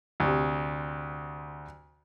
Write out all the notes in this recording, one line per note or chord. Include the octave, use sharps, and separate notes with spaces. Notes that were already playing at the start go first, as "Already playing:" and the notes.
D2 C3